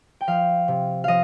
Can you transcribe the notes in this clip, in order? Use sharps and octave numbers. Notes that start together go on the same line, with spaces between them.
G5
F3 F5
C3
F3 D#5 F5